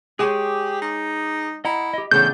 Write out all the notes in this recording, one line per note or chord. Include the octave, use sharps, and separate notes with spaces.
G#3 G4 G#4 C#5 D6
D#4
E4 D#5 F#5 A#5
G4 D#5
A2 C#3 E3 B3 D4 G6